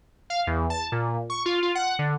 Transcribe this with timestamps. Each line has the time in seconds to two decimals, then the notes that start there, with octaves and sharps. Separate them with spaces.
0.30 F5
0.47 E2
0.70 A5
0.92 A#2
1.30 C#6
1.46 F4
1.63 F4
1.75 F#5
1.99 D3